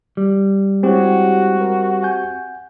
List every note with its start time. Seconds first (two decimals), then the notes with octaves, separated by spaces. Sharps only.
0.17 G3
0.83 G#3 C4 E4 F#4 G4 C#5
1.61 A#4
2.03 F#5 G#5 G6